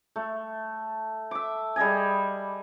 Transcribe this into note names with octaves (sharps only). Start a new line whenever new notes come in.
A3
E5 D6
G3 G#4 D#5 G#5